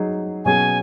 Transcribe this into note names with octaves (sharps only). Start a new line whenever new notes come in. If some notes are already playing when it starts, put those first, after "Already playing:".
Already playing: F#3 D#4 G#4
B2 F#3 C#4 G#4 G#5